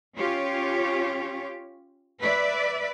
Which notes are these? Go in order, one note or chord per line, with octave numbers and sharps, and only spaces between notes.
C#4 F4 G4 C#5
B4 D5 E5